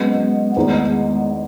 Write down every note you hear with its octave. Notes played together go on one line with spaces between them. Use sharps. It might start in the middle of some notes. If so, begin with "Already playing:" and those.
Already playing: F#3 G#3 B3 C#4 G#4 B4
E2 D#3 G#3 A3 B3 D#4 G#4